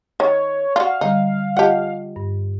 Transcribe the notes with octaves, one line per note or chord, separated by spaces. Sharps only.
D#3 C#5
F4 F#4 D5 F5
D3 G3 D#4
F4 G4 D#5 F#5 A5
G2